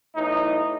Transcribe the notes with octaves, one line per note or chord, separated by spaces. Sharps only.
B1 A2 E3 D#4